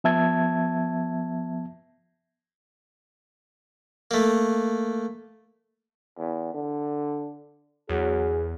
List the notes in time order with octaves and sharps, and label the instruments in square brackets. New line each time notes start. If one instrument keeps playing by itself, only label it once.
[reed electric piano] F3 B3 E5 A5 G#6
[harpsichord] A3 A#3
[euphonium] E2
D3
[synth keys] E2 [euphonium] F#3 [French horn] G#4